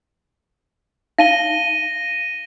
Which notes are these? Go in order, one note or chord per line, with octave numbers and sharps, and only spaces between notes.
D#4 F5 A#6 D#7 G7